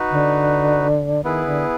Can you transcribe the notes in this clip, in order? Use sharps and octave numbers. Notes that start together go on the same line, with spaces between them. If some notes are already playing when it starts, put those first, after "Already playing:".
Already playing: D#4 F#4 B4
D3
D#3 B3 E4 G#4 B4
D3